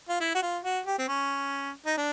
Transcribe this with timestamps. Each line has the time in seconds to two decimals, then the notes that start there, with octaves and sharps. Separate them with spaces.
0.09 F4
0.20 E4
0.35 F#4
0.42 F4
0.64 F#4
0.86 G4
0.98 C4
1.08 C#4
1.86 D#4
1.97 D4